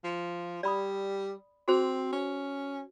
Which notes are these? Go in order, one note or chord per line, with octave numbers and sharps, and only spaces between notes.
F3
G3 D5 B5 D#6
C4 F#4 G#4 C5
C#4